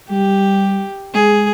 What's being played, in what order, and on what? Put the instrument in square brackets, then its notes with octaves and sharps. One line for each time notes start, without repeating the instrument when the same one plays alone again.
[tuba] G3 [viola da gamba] G4
[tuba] G#3 [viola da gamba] G#4